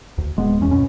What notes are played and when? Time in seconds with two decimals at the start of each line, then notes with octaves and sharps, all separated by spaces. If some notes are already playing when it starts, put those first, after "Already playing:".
0.18 D2
0.36 D1 G#3 B3
0.59 D1 E2 C#4
0.71 C#2 F#2 B2 C#4